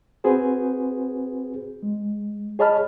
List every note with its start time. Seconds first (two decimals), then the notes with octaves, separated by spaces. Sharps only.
0.24 C4 F#4 G#4 B4 C5
1.83 G#3
2.59 G#4 C#5 D#5 A5 B5 F6